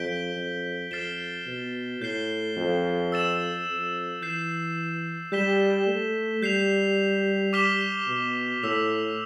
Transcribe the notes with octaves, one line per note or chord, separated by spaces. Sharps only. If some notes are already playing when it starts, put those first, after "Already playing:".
Already playing: F2 G6 B6 D7 G7
F2
F2 F6 A6 C7 E7 G7
B2
A2 G6 C7 G7
F2
E6 A6 E7
F2
E3 G6 C7 E7
G3 G6 B6 E7 G7
A3
G3 G6 C7 F7
D6 F6 B6 E7 G7
B2
A2 E6 B6 F7